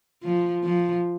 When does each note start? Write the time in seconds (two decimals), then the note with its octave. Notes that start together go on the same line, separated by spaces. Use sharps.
0.23 F3
0.64 F3